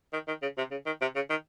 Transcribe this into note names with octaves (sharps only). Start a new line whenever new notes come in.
D#3
D#3
C#3
C3
C#3
D#3
C3
C#3
D#3